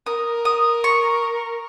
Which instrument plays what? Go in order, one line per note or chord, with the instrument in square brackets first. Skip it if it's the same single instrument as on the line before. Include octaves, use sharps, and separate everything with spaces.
[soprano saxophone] A#4 [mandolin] D#6
[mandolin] D#6
C#6